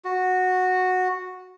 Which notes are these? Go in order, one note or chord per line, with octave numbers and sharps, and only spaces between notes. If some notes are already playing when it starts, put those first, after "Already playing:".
F#4